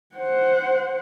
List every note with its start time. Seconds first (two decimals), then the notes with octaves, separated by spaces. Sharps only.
0.16 C5 F#5